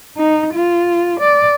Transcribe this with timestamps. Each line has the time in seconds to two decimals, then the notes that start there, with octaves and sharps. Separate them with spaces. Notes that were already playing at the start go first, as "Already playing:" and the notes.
0.17 D#4
0.55 F4
1.20 D5